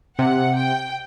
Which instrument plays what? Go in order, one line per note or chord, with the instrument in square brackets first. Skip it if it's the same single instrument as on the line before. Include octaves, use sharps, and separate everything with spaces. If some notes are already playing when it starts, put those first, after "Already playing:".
[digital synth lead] C3 [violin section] F#5
[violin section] G5